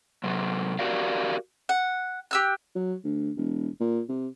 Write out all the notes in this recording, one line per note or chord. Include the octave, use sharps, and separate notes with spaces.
C3 F#3
F#4 G4 A#4 D5 F5
F#5
G4 E6 F#6
F#3
D2
E1
A#2
C3